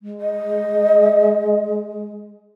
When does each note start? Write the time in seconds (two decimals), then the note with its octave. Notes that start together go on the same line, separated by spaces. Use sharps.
0.01 G#3
0.21 D#5